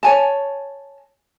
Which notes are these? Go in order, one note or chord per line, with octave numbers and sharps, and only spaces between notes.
C#5 G#5 A5